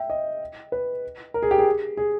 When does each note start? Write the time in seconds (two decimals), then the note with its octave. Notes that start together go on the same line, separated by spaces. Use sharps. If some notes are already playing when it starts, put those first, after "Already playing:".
Already playing: E5 G5
0.10 D#5
0.72 B4
1.34 A#4
1.42 G#4
1.51 G4
1.58 G#4
1.97 G#4